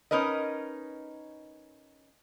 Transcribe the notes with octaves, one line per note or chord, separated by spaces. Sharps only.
C#4 D#4 A#4 B4 D#5